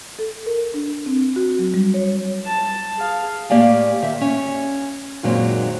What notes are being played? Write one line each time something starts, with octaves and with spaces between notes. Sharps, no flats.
A4
A#4
D4
C4
F#4
F#3
G3
C#5
A5
G#4 F5
A2 A#3 G4 D5 F5 G#5
D#3 E5
C#4
F#2 A#2 D#3 F#3 G#3 C4